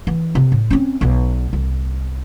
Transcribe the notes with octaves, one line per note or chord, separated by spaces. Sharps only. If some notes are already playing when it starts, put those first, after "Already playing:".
E3
C3
A2
C4 C#4
B1 B2
C2